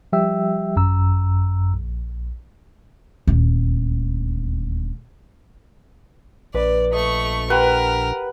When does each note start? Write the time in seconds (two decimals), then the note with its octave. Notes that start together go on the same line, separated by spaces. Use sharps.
0.13 F3 G3 G4 E5 G5 E6
0.76 G#1 F#2 A#5 E6
1.74 A#1
3.27 D#1 D2
6.54 A#1 B4 D5
6.92 A3 D#5 C#6
7.50 G4 A#4 B4 F#5 G5